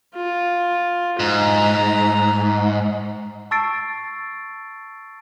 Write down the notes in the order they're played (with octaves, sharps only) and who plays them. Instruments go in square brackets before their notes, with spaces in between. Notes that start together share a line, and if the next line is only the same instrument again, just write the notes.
[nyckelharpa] F4
[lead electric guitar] G#2 [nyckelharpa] A#5
[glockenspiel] A5 C#6 E6 A6 C7 D7